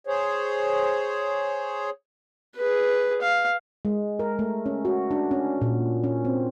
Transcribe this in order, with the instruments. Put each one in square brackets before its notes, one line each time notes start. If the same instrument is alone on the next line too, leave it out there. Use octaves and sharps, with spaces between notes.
[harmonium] G#4 C5 C#5
[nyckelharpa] G#4 B4
F5
[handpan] G#3
A#4
A3
C#4
F#4
D4
C#4
A#2
C#4
C4